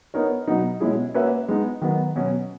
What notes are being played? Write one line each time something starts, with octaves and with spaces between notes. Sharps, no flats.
B3 D#4 A#4 C#5
B2 F#3 B3 D#4
B2 G#3 C#4 E4 G#4
A#3 C#4 F#4 B4 E5
G#3 B3 D#4
D#3 F#3 B3 F#4
B2 F#3 C#4